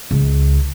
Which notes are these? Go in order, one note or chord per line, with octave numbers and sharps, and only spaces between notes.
C#2